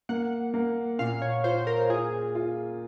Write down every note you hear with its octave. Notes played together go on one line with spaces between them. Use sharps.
A#3 F#5
A#3
A#2 F5
C#5
F4 C5
A#4
F4 G#4
F4